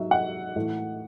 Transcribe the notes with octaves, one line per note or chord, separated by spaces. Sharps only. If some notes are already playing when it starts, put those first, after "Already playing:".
Already playing: G#2 F#3 E5
F#5
A2 E3 A3